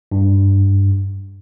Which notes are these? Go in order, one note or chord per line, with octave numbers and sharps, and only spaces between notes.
G2